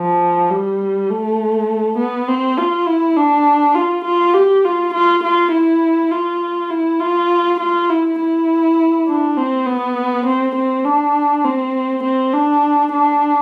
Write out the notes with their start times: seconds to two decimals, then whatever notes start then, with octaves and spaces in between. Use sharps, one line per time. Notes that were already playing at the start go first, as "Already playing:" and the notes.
Already playing: F3
0.51 G3
1.10 A3
1.98 B3
2.28 C4
2.57 F4
2.86 E4
3.17 D4
3.75 F4
4.04 F4
4.34 G4
4.65 F4
4.94 F4
5.24 F4
5.52 E4
6.11 F4
6.71 E4
7.00 F4
7.60 F4
7.89 E4
8.19 E4
9.07 D4
9.37 C4
9.66 B3
10.25 C4
10.55 C4
10.84 D4
11.44 C4
12.03 C4
12.33 D4
12.92 D4